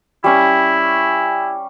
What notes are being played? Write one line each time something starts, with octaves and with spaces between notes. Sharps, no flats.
G3 C#4 E4 C#6